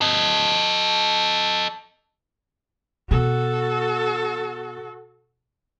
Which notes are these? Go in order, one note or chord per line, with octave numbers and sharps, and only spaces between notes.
A4 D#5
B2 F#4 A4